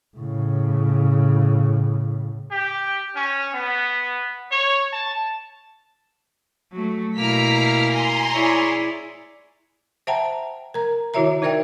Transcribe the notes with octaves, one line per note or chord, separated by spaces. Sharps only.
A2 C#3
G4
C#4
B3
C#5
A5
F#3 A3
B2 A#3 E4 A#5 F6 B6
G#5 A#5 C6
E4 G#4 C#5 D5
C5 E5 F#5 G5 A5 A#5
A#4 A#5
D#3 E4 F#4 C#5 E5 A#5
D#4 A#4 C5 D5 E5 G5